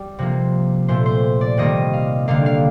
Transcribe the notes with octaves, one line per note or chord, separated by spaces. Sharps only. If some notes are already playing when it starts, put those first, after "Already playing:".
Already playing: G3
C3 F3 A#3
A#2 A3 C5
C5
D5
C3 D#3 G3 A#3 D#5
F5
D3 G3 A#3 F5
F5